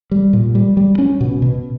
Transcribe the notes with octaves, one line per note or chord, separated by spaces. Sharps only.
G3
A#2
G3
G3
C#4
B2
B2